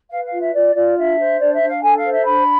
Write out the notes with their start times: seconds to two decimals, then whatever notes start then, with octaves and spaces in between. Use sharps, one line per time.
0.11 B4 F5
0.25 F5
0.32 F4
0.39 E5
0.54 F4 D5
0.74 F4 D5
0.96 D4 E5
1.18 C5
1.39 D4 D5
1.54 E5
1.61 D4
1.68 F5
1.83 A4 G#5
1.97 F5
2.05 C5
2.11 E5
2.25 D4 B5